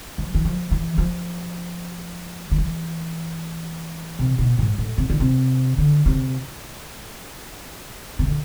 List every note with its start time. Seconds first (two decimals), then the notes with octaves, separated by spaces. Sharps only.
0.18 F3
0.34 E3
0.45 F3
0.71 E3
0.98 F3
2.52 F3
2.58 E3
4.19 C3
4.39 B2
4.59 G#2
4.78 A2
4.98 C3
5.10 D3
5.20 C3
5.78 D3
6.06 C3
8.19 C3
8.27 D3